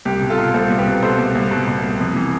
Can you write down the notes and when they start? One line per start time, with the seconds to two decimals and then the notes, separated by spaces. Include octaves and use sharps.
0.05 C2 G4
0.22 B2
0.30 F4 A4
0.38 B2
0.54 C2 A4 C5
0.70 C2
0.78 G4 B4
0.86 B2
1.02 B2 A4 C5
1.19 C2
1.35 C2
1.51 B2
1.67 B2
1.83 C2
2.00 F2
2.16 E3